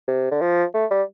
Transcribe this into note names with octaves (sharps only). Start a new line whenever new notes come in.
C3
D3
F3
A3
G3